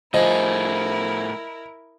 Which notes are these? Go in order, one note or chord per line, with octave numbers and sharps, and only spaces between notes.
A2 F3 E4 G#4 A#4 D#5